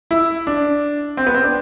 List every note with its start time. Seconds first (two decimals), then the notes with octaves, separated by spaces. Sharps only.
0.11 E4
0.47 D4
1.17 C4
1.27 B3
1.34 C4
1.44 D4